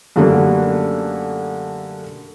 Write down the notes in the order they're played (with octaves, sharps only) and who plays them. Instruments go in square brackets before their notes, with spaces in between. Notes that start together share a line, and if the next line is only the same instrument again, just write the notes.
[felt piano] F#2 D3 G3 A3 A#3 D4